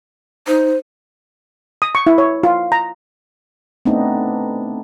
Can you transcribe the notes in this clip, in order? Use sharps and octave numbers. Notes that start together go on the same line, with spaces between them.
D#4 C5
D#6
C#6
E4
C#5
F4
A#5
A3 B3 C4 D4 D#4